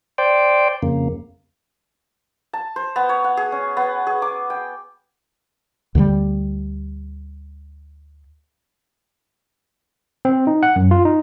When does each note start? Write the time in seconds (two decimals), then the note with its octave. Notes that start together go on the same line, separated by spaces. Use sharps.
0.18 C5 D5 G5
0.83 F2 C#3 A#3
2.53 A5
2.76 C5
2.96 B3
3.09 C#5
3.24 F#5
3.37 G#4
3.52 C#4
3.77 B3
4.07 G#4
4.22 D6
4.50 G5
5.95 D2 D3 E3 G3
10.25 C4
10.47 D#4
10.63 F#5
10.76 F#2
10.91 F4
11.05 D#4